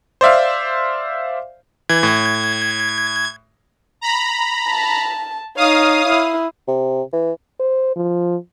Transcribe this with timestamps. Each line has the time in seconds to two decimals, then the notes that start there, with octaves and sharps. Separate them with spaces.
0.21 C5 D5 E5 F5
1.89 E3 G#6
2.03 A2
4.01 A#5 B5
4.69 A5
5.57 D#4 C#5 F5 D#6
6.07 E4
6.68 C3
7.13 E3
7.60 C5
7.96 F3